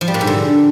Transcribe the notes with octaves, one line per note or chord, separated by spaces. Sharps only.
F3
G3
A#2
G#2
D3